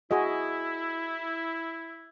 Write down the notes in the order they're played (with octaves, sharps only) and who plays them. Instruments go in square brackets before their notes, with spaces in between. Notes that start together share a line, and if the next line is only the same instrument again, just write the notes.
[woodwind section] E4 [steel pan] F#4 G#4 D#5